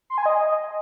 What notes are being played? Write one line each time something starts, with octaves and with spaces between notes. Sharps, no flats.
C6
G#5
D#5